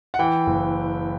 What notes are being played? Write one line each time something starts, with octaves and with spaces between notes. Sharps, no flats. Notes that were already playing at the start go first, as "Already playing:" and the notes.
F#5
E3 G5
F#1